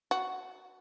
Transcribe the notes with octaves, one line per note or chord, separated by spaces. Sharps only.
F#4